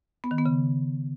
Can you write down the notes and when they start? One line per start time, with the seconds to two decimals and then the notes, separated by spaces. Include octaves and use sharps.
0.24 B3
0.31 D#3
0.38 B3
0.46 C#3